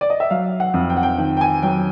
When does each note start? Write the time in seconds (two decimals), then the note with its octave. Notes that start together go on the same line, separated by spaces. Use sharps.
0.01 D5
0.10 D#5
0.20 E5
0.30 F#3 F5
0.60 F#5
0.74 F2
0.90 G5
0.97 F#5
1.03 G5
1.18 D#3 G5
1.37 G5
1.41 G#5
1.63 F#3 G5